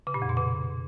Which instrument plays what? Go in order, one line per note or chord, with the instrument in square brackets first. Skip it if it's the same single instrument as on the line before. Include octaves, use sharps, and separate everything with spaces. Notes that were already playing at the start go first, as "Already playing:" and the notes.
[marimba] C#3
A#2
F2
B2
C#3